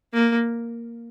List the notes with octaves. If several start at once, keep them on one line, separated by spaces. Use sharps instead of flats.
A#3